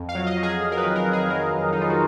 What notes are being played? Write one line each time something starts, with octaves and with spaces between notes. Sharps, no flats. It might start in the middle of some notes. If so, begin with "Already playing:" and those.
Already playing: F2
F5
F#3
D#5
F#3
G#4
F2
A#4
B4
D#3
A#4
D#3
G#4
F#3 A#4
F2
F2 D#4
F4
F#4